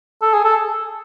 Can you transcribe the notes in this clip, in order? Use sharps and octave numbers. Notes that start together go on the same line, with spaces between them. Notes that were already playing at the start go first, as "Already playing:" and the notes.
A4
G#4
A4